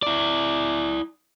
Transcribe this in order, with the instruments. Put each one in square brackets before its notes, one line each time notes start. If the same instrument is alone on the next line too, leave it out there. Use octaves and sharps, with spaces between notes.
[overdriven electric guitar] E4 D5